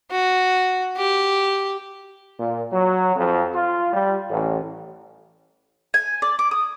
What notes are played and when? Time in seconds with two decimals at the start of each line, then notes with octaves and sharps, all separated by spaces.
0.11 F#4
0.97 G4
2.39 A#2
2.72 F#3
3.16 F2
3.53 F4
3.93 G3
4.30 A1
5.94 G#5
6.22 D5
6.39 D6
6.51 D#6